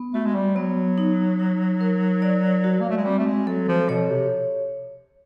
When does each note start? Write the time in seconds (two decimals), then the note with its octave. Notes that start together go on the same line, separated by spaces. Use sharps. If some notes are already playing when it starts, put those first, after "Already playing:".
Already playing: B3
0.14 A3 F#4
0.26 G#3
0.35 G3
0.56 F#3 B3
0.98 D#4
1.39 D#4
1.81 A#4
2.22 D5
2.64 F#4
2.80 A#3
2.90 A3
2.97 G#3
3.05 G3 C4
3.18 A3
3.27 G#3
3.47 F#3 A4
3.68 F3
3.89 B2 C#5
4.10 C3